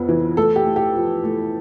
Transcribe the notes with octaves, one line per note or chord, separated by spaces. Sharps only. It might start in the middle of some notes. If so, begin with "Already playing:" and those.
Already playing: F2 B3
E3
A3 A4
G4
A3
G4
F3
A3